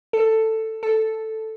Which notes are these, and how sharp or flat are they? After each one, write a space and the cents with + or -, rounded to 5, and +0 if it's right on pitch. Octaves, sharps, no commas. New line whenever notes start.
A4 +10
A4 +0